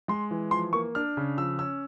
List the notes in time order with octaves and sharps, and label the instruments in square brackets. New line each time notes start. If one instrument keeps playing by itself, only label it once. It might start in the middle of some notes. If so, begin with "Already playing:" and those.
[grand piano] G#3 C6
E3
F3 C6
A#3 C#6
D4 F6
C#3
F3 E6
C#4 E6